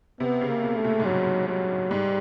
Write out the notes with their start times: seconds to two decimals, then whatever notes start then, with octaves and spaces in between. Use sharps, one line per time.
0.20 C3 B3
0.41 C#3
0.49 A#3
0.63 B2
0.77 A3
0.85 A#2
1.00 G#2
1.05 G2 F#3
1.47 F#3
1.90 G#2 G3